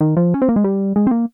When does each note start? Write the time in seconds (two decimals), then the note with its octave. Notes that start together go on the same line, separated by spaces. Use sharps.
0.01 D#3
0.17 F3
0.34 C#4
0.42 C4
0.49 A#3
0.56 G#3
0.64 G3
0.96 G#3
1.07 C4
1.11 A#3